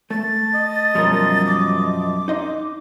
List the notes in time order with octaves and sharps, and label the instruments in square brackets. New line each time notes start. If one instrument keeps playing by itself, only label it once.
[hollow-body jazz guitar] A3 [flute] A6
[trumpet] D#5
[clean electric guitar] F#2 B2 F3 [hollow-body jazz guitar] G3 A#4
[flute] D6
[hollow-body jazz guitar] D#4 D#5 C6